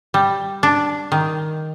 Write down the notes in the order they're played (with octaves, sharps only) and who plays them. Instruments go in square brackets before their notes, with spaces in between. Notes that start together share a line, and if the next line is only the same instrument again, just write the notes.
[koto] G3
D4
D#3